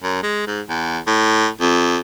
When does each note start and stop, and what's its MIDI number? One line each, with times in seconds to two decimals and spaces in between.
0.03 0.18 42
0.23 0.46 56
0.47 0.61 44
0.69 0.99 40
1.07 1.48 45
1.61 1.99 41